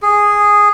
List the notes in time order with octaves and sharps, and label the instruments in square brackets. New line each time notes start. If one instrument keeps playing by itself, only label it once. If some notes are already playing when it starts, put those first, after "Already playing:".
[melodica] G#4